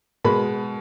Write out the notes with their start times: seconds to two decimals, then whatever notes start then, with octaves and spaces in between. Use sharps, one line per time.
0.25 B2 G#3 B5